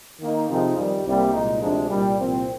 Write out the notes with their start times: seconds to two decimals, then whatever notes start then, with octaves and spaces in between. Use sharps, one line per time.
0.20 D#3 A#3 D#4
0.48 C3 F3 C4 D#4 G#4
0.76 F2 D#3 G3
1.04 C2 C3 G3 A#3
1.33 C2 A#2 G#3 D#4
1.61 D2 C3 F3 G#3 D4
1.89 C2 A#2 G3
2.17 C2 A#2 F3 C4